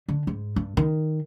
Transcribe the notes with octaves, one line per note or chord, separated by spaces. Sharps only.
D3
G#2
G2
D#3